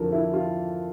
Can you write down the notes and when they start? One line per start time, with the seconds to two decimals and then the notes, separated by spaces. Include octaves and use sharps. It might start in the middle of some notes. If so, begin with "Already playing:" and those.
Already playing: F2 D3 F3 A4 A#4
0.12 E4
0.33 F4